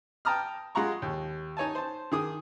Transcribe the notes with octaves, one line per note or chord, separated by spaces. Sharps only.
G5 A5 A#5 D#6 F6
G#3 F4 F#5 A#5 C#6
D#2
D#4 C#5 G#5 A5
C5 A5
D#3 G#4 D#6